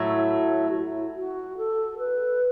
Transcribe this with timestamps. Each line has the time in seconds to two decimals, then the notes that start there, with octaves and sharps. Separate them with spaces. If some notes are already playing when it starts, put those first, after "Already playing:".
Already playing: A2 F#3 A3
0.13 E4
1.16 F#4
1.57 A4
1.98 B4